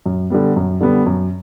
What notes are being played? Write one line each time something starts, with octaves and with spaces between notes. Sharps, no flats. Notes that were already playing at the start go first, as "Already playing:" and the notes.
F#2
D3 G3 B3
F#2
D3 G3 B3
F#2